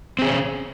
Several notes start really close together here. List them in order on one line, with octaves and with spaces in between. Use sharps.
C4 G#4 C#4